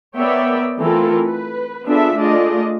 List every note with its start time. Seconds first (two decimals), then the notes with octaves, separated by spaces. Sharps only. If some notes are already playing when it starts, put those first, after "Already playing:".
0.18 B3 A#4 C#5 D5 E5 G5
0.78 E3 A3 C4 F4 A4 A#4
1.24 B4
1.87 B3 D4 F4 G#4 A4 E5
2.18 A3 D4 F4 G#4 D5 D#5